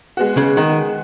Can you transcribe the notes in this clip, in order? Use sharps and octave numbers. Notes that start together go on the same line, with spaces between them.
G#3 B3 F#4
C#3
D#3